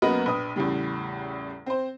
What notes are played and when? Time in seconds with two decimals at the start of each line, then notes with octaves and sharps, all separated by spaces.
0.02 F#2 A#3 B3 F#4 D#5 B5
0.26 A#1 B4 D#6
0.56 E2 A2 C#3 G3
1.66 C4 C5